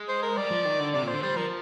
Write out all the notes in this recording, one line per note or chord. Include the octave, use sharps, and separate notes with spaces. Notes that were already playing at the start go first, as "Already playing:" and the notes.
Already playing: G#3
C5
A#4
G3 D5
F3
D#3
D3
C3 D5
A#2 C5
D3
G3 C5
F3 A#4